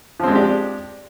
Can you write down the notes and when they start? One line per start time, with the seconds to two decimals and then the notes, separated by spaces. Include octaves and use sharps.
0.20 F3
0.23 C4
0.27 G#3
0.31 D4
0.35 G4